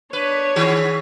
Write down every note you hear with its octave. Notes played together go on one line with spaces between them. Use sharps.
D4 B4 C#5
D#3 F#4 G#4